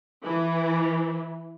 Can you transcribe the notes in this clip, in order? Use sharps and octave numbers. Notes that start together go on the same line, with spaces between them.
E3